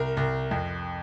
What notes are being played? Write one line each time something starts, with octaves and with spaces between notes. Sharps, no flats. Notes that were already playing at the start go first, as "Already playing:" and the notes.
Already playing: C2 A#4
C2
F2